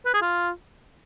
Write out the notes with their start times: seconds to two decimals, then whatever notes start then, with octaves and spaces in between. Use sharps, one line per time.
0.06 B4
0.14 G#4
0.22 F4